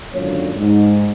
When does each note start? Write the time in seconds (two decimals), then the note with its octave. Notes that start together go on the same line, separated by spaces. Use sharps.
0.13 G#1 F#2 A#2 D3 C#5
0.57 G#2